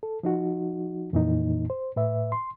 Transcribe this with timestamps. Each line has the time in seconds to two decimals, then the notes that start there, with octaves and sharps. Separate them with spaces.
0.03 A4
0.23 F3 D#4 F#4
1.13 F2 A#2 E3 A#3 D#4
1.70 C5
1.96 A2 B4 E5
2.32 C6